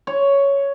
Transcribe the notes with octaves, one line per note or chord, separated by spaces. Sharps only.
C#5